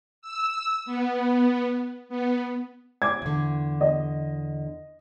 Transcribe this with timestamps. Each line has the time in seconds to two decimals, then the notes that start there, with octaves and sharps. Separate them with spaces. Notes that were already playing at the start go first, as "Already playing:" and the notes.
0.22 E6
0.86 B3
2.09 B3
3.02 D6 G#6
3.22 E2 D3
3.81 D#5